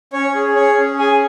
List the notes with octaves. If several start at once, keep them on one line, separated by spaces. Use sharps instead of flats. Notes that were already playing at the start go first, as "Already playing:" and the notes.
C#4 C#5
G#4
C#4 C#5
C#4
G#4 G#5